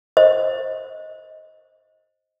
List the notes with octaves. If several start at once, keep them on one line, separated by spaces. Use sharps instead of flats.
C5 D#5